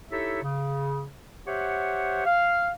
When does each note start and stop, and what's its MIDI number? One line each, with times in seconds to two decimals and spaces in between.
0.11 0.40 63
0.11 0.40 64
0.11 0.40 67
0.11 0.40 69
0.11 0.40 73
0.11 0.40 76
0.43 1.08 49
1.47 2.25 67
1.47 2.25 72
1.47 2.25 73
1.47 2.25 76
1.47 2.25 78
2.26 2.70 77